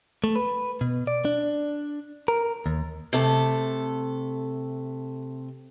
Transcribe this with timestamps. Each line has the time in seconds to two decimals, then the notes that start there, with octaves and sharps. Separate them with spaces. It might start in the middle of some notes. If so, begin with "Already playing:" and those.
0.24 A3
0.36 B4
0.81 B2
1.07 D5
1.25 D4
2.28 A#4
2.66 D#2
3.13 C3 A3 A4